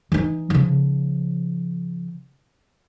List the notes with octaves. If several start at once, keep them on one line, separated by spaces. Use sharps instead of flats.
E3 D#4
C#3 F3